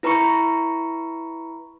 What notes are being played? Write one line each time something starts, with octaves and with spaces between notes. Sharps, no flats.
E4 B4 A#5 B5 C#6 C#7